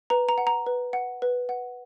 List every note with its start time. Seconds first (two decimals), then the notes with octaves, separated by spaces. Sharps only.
0.10 B4 A#5
0.29 A#5
0.38 F#5
0.47 A#5
0.66 B4
0.93 F#5
1.22 B4
1.49 F#5